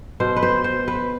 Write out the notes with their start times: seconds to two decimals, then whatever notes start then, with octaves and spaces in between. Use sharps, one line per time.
0.20 B2 C5
0.36 B4
0.43 C5
0.64 C5
0.88 B4